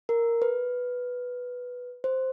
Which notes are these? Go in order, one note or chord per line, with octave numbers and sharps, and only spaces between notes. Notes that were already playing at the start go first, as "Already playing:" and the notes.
A#4
B4
C5